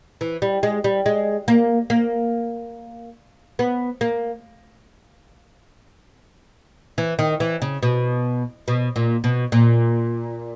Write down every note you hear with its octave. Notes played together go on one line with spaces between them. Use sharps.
E3
G3
G#3
G3
G#3
A#3
A#3
B3
A#3
E3
D#3
E3
C#3
B2
B2
A#2
B2
A#2